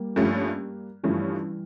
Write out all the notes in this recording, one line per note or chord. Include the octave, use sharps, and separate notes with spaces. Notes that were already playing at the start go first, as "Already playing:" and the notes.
Already playing: G3 A#3
G2 F3 A3 C#4
G2 E3 F3 G3 A3 C#4